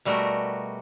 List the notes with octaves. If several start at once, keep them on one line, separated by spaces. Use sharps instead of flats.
B2 G3 A3 F#4 A#4